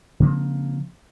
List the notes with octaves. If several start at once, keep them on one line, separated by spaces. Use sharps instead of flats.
C#3 F3 A#3 C4